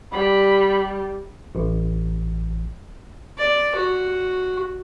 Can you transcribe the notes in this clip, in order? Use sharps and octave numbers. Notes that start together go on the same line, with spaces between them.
G3 B5
A1
D5
F#4